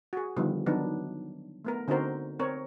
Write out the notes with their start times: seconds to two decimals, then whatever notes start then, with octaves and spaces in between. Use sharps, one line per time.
0.13 F#4 G#4
0.37 D3 D#3 F3 G3 B3
0.66 D#3 F#3 B3 D4 D#4
1.65 A3 B3 A#4
1.88 D3 C4 D#4 F#4 A#4 C5
2.39 C4 A#4 C#5